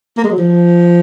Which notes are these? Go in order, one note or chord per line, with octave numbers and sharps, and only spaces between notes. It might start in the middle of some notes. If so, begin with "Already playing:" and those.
A#3
G#3
F#3
F3